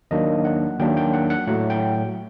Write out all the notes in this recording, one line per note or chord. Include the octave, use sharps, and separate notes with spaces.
D#2 D#3 F#3 A#3 D4 D#5
F#5
D#2 D#3 F#3 A#3 D4 G5
G5
F#5
F#5
A2 F#3 A3 F#5
G5